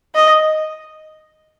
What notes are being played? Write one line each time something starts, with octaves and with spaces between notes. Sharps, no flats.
D#5